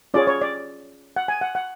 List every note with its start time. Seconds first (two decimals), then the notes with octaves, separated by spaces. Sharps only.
0.14 C#4 F4 G#4 C#5 D5
0.27 C#5
0.42 D5
1.16 F#5
1.28 G#5
1.41 F#5
1.55 F#5